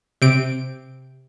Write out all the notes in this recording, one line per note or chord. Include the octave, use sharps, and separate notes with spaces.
C3 D7